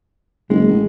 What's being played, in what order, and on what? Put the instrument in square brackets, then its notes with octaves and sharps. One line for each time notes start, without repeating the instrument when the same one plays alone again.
[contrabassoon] F#1 [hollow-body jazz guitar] G#3
[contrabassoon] A1